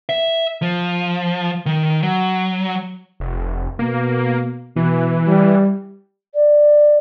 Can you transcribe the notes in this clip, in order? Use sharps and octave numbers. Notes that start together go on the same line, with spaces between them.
E5
F3
D#3
F#3
F1
B2 A#3
B2 E3
G3
D5